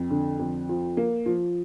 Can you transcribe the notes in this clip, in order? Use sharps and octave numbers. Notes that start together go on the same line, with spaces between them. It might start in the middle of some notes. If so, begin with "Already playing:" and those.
Already playing: F2
D3
F2
F3
A#3
F3